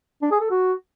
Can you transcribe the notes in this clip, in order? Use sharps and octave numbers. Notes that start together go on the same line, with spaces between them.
D4
G#4
A4
F#4